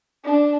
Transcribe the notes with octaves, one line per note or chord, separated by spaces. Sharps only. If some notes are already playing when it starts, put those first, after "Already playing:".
D4